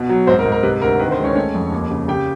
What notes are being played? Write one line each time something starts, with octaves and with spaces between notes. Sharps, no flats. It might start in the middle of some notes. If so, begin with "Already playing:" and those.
Already playing: B2
F#3
G#2 C4 C5
A#4
G#2
A#4
C3 B4
D2 A#4
D#3 B4
C4 C5
G#3
C#4 C#5
A3 C#4 C#5
F2
D#2
C#3
C#3 G4 G5